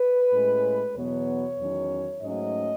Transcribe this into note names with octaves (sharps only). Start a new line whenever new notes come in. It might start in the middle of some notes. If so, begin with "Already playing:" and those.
Already playing: B4
A2 G#3 C#4
E2 B2 F#3 B3 C#5
E2 D#3 F#3 C#4
G#2 F#3 A3 C#4 D#5